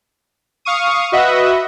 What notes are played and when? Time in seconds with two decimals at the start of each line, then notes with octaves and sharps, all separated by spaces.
0.65 F5 C#6 D#6
1.12 F#4 B4 D#5 E5 F#5